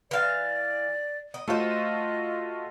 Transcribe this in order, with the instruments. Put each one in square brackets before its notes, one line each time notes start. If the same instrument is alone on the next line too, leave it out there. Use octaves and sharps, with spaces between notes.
[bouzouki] E3 F5 [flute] D5
[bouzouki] D#5
[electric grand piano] A3 F4 F#4 [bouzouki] A4 C5 [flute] D#5